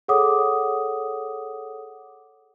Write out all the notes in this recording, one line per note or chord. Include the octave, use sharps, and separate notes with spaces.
G#4 A4 C#5 F#5 D6 D#6